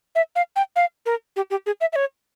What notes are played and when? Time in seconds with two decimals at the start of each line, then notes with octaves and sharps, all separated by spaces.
0.15 E5
0.36 F5
0.56 G5
0.76 F5
1.06 A#4
1.36 G4
1.50 G4
1.66 G#4
1.81 E5
1.93 E5
1.96 C#5